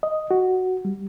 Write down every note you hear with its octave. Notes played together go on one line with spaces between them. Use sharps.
D#5
F#4
G3